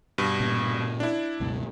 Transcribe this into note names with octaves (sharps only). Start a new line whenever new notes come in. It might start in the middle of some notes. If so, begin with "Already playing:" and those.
G2 B2
A#2 C#3
D4 E4
C#2 F#2 B2